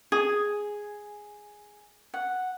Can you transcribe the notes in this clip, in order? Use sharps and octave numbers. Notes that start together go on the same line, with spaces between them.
G#4
F#5